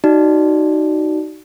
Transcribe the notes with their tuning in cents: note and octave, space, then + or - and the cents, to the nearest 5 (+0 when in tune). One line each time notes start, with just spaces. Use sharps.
D#4 +0 F#4 +25 D5 +0